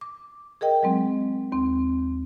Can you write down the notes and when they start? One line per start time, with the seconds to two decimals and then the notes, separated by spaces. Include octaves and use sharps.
0.01 D6
0.61 G#4 A#4 D#5 G5
0.83 F#3 G#3 C4
1.52 D#2 C4